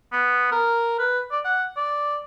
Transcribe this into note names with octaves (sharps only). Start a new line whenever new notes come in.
B3
A#4
B4
D5
F#5
D5